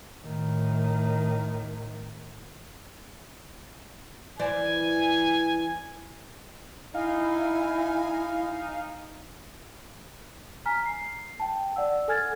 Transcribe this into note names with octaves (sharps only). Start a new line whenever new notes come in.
A2 D#3
E3 C5 D5 G#5
D#4 E4 F5 G#5
G#5 A#5 F6 B6
C7
G5 A5
D5 F#5 E6
A4 G#5 F6 G#6 A6